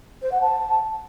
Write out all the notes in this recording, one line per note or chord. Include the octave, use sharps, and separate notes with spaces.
C5
F#5
A5